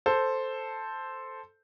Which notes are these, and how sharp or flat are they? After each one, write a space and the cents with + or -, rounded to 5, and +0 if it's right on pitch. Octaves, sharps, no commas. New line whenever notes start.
A4 +0 C5 +0